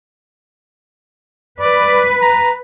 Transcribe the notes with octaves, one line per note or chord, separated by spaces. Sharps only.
B4 D5
A#5